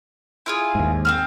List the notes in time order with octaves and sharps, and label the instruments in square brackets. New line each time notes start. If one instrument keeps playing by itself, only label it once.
[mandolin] E4 F4 G#4
[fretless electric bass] D#2 G#2
[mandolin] C4 F#4 F6